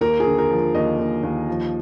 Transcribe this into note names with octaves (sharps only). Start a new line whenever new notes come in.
D#2 A#4
G#4
D3
A#4
F3
D#2 D#5
D#2
D#2
F3